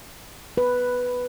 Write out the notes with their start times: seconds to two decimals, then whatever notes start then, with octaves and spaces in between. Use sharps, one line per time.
0.57 B4